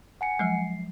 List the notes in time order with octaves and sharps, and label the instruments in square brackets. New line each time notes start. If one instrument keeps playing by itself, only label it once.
[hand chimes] F#5 G#5 C#7
[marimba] F3 F#3 G#3 [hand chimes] C7